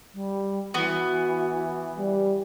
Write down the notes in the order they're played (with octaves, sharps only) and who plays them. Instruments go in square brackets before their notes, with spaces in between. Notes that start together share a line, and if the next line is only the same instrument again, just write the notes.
[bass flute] G3
[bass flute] E3 [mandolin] B3 [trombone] F#4
[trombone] G3